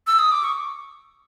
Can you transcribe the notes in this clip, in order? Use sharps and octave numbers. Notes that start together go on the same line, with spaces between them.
E6
D#6
D6
C#6